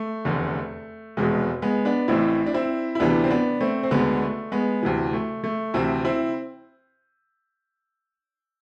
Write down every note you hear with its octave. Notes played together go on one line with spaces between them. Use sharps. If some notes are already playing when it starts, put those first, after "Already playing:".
Already playing: A3
F1 E2 D3
F1 E2 B2 G#3
G#3 B3
B3 D4
A1 A2 E3 C4 E4
D4
C4 E4
E4
D2 C3 E3 B3 D4
C4
B3 D4
A3 C4
C4
D2 D3 G#3 B3
A3
G#3 B3
D2 C3 E3
A3
A3
D2 C3 E3 C4 E4
C4 E4